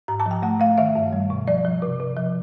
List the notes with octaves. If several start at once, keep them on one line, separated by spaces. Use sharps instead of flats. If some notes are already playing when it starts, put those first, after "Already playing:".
G#2 A#5
A5
F3
G5
A3 F#5
A3 F5
D#3 E5
G2
G3
B2
F3 D5
F3
C3
C3
F3